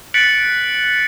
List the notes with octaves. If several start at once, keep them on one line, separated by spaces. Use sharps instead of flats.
F#6 A6 B6 C#7 D7 F#7